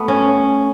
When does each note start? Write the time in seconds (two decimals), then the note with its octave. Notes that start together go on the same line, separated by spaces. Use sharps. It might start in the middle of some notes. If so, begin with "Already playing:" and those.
Already playing: A3 B3
0.08 C#4